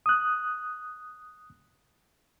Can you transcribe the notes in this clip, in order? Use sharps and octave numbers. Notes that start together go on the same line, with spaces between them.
D#6 F#6